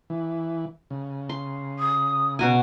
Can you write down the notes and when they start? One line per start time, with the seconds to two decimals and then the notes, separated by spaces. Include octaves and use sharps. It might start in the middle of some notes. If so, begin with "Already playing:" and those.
0.10 E3
0.90 C#3
1.29 C6
1.79 D#6
2.39 B2 F#4 G#5 A#5